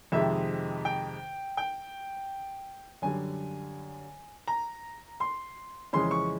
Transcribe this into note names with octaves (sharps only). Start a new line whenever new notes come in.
F2 C3 D#3 G#3 E5
G5
G5
F#2 D3 G3 G#5
A#5
C6
F2 C#3 E3 G#3 C#4 C6
C#6